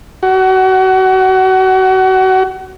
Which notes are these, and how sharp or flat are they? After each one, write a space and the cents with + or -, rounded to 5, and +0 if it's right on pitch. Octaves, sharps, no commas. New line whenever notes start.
F#4 +30